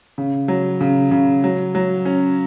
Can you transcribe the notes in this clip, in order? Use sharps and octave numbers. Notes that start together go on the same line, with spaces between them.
C#3
F#3
C#3
C#3
F#3
F#3
C#4